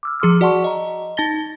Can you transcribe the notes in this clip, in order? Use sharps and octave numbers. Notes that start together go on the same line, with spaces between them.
D6 E6 F6
F3 G#4 C6 D6 E6 F6
F#4 D5 F#5 A5 C6 C#6
D#5 A#5
D#4 A5 A6 A#6 G7